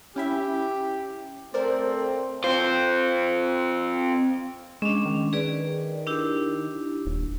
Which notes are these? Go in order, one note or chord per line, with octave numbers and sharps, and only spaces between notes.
C#4 E4 G4 E5
A3 C4 A#4 C5 D5
C4 F4 C5
G#3 C#4 D4
D#3
G#4 B4 D5
D4 E4 G4
D#1